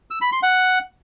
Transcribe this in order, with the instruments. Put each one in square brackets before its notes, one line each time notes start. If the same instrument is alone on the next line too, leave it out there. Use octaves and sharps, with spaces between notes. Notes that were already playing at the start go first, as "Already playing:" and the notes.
[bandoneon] E6
B5
C6
F#5